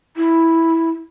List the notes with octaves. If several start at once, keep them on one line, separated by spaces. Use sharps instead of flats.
E4